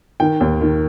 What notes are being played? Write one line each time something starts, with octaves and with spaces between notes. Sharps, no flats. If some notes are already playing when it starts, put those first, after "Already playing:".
D#3 G5
D#2
D#3